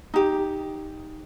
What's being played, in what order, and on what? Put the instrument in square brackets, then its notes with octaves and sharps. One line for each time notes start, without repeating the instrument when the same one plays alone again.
[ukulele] D#4 G4